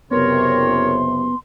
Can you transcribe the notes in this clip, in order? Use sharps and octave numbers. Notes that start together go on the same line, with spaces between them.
F#1 C3 B3 A#4 C#5 C6